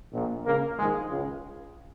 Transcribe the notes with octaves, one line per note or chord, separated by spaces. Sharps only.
A#1 A#2
C#2 C#3 A#3 A#4
A#1 G#2 D#3 G#3 G#4
C#2 C#3